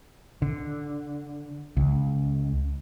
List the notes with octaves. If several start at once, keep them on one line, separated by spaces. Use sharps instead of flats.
D3
C#2